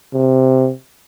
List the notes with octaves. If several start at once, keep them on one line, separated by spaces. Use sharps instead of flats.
C3